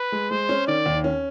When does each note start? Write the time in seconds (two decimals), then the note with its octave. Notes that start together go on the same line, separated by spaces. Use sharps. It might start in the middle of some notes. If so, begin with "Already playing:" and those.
Already playing: B4
0.12 G#3
0.30 G#3 C5
0.49 C#4
0.67 D#3 D5
0.86 D#2
1.04 C#4